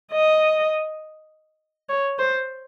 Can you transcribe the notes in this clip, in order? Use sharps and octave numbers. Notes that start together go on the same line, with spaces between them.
D#5
C#5
C5